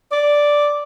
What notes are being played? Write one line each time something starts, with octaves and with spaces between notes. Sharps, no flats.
D5